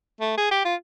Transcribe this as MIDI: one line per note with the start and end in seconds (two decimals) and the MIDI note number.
0.21 0.36 57
0.38 0.48 68
0.51 0.63 67
0.65 0.75 65